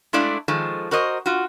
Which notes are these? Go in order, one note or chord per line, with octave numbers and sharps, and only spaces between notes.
G#3 A3 D4 E4 D5 F5
D#3 F3 G#3 A4
F#4 A#4 C5 D#5
F4 F#4